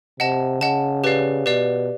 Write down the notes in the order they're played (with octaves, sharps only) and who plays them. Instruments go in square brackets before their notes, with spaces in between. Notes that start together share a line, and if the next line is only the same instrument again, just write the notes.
[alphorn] C3 [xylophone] D#5 F#5 A5
[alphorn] C#3 [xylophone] D#5 F#5 A5
[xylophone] G4 B4 D5 F5
[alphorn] B2 [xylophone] G4 B4 D5 F5